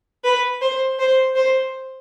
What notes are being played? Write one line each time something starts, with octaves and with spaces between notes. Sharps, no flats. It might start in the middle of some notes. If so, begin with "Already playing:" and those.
B4
C5
C5
C5